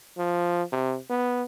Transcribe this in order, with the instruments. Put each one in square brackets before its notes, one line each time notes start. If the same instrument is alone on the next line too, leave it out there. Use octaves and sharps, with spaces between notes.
[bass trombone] F3
C3
B3